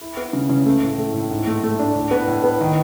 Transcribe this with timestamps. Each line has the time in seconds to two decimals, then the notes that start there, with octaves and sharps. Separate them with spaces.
0.01 E4
0.17 B3
0.33 C#3
0.50 C#3
0.66 A3
0.82 A2
0.98 A3
1.14 A2
1.31 G#2
1.47 A3
1.64 A3
1.79 D4
1.95 A2
2.11 B3
2.28 A2
2.44 B3
2.61 D#3